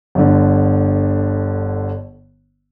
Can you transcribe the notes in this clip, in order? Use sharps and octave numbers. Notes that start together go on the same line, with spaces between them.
G1 D3